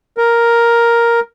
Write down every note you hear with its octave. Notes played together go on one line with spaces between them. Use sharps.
A#4